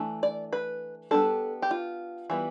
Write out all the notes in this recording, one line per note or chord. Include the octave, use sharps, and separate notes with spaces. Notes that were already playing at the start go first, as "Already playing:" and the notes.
Already playing: E3 A3 D4
D5
B4
G3 B3 D4 A4
G4
F4
E3 G3 B3